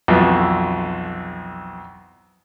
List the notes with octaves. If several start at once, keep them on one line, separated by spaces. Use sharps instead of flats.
B1 F2 E3